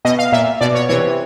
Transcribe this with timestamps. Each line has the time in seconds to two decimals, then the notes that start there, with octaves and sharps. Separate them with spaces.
0.05 B2 D#5
0.19 F5
0.32 A#2 E5
0.61 B2 D5
0.75 C#5
0.89 C3 E3 C#5